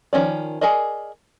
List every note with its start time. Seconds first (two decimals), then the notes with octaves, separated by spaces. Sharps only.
0.13 D#3 F3 C4 C#4 D5
0.61 G#4 A#4 D5 D#5